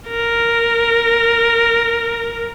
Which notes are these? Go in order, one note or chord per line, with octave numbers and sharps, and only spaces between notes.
A#4